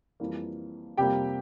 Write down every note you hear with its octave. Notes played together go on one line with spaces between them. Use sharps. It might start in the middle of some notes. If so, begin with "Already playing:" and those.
F2 E3 G3 A#3
F2 C3 G3 A#3 G4 G5